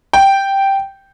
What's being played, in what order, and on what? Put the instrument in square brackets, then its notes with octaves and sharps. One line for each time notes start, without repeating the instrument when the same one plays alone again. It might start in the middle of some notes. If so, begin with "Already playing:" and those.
[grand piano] G5